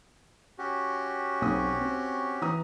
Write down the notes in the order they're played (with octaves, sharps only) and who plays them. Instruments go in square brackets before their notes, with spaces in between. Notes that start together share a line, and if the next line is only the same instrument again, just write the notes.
[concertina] C#4 F#4 G4
[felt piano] B1 C4 D#6
C4
E3 A#5 D#6